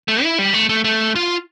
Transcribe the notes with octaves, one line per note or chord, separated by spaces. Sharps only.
A3
E4
G3
A3
A3
A3
F4